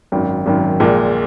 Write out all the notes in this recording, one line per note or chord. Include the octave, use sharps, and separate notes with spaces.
G#1 F#2 D#3
G#1 F#2 D#3
A#1 A#2 G#3